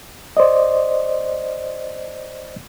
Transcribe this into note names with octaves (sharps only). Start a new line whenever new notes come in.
C5 D5 D#5